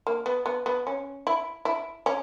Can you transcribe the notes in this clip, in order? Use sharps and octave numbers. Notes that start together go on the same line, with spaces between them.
A#3
B3
B3
B3
C#4
E4
E4
C#4